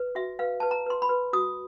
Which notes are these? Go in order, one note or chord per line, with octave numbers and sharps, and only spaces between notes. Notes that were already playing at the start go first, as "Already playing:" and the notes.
Already playing: B4
F#4 E5
B4 F5
B4 A5
A#5
B4 C6
B5
B4
F#4 D#6